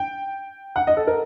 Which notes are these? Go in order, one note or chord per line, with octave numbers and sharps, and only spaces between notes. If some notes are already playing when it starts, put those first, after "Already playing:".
Already playing: G5
F#5
D#5
A4
A#4